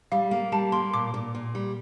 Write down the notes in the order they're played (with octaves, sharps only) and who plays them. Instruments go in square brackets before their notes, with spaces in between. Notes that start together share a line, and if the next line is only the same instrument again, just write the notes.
[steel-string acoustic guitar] G3 [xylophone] F5
[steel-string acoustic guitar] A#3
[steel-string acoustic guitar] G3 [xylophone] A5
[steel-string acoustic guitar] A#3 [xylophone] C6
[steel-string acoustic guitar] A#2 [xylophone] D6
[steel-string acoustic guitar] A#2
A#2
G3